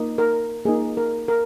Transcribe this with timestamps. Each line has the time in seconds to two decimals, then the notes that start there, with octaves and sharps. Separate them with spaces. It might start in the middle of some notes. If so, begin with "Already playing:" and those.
Already playing: A#3 D#4
0.18 A#4
0.65 A#3 D#4 G#4
0.97 A#4
1.28 A#4